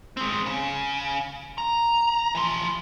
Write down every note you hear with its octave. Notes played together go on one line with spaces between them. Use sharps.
G#3 C4
C#3
A#5
E3 F3